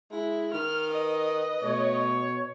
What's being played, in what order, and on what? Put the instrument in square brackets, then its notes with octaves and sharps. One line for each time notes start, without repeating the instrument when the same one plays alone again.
[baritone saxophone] G#3 [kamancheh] E4
[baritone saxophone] D#3 [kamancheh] F6
[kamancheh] B4 D#5
[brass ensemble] B2 C#5 [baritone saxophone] A3